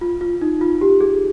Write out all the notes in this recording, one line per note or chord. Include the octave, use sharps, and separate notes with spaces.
F4
F4
D#4
F4
G4
G#4